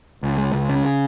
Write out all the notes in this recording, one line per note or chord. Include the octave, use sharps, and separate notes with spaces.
C#2
G#3
C#2
C#3